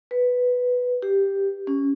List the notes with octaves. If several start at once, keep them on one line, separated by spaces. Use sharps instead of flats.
B4
G4
C#4